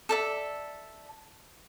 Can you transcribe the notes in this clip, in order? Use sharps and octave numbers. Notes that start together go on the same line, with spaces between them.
A4 D5 E5